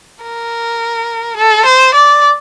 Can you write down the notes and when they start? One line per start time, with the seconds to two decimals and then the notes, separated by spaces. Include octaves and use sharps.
0.23 A#4
1.37 A4
1.66 C5
1.94 D5